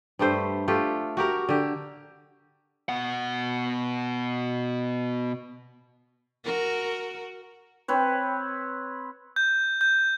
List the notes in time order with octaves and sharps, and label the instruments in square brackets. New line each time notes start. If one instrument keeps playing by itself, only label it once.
[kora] G2 G3 A3 C5
A3 F4 G4
F#4 G4 A#4
D3 G4
[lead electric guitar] B2 F#5
[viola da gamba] F#4 A#4
[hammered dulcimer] C4 B4 C#5
[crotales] G6
G6